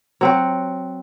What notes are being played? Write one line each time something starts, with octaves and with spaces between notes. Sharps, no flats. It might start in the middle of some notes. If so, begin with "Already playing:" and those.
F#3 C4 F#4